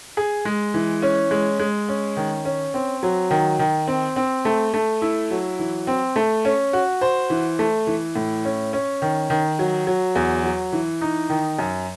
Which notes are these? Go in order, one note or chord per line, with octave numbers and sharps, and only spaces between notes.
G#4
G#3
E3
C#4
G#3
G#3
C#4
D#3
C#4
C4
F#3
D#3
D#3
C4
C4
A3
A3
E4
F#3
E3
C4
A3
C#4
F#4
C5
E3
A3
E3
A2
C#4
C#4
D#3
D#3
F#3
F#3
E2
F#3
E3
D#4
D#3
F#2